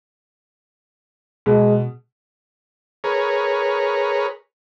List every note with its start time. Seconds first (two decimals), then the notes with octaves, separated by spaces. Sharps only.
1.46 B2 G#3
3.04 G#4 A#4 B4 C#5